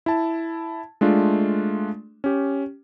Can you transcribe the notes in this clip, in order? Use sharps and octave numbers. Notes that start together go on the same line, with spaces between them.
E4 A5
G#3 A3 D4 F4
C#4 G4